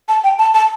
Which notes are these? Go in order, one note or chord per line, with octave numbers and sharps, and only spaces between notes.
A5
G5
A5
A5